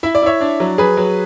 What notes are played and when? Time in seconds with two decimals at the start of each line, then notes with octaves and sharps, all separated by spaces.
0.03 E4 E5
0.15 D5
0.22 E4 C#5 E5
0.41 D4
0.60 F#3
0.78 F#3 G#4 B4
0.97 F#3